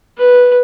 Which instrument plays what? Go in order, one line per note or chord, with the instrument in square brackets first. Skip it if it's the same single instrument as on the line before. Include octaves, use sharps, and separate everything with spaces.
[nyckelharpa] B4